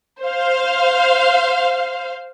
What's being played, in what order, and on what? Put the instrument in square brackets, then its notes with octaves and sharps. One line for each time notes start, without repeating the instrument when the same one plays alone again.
[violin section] C5 F5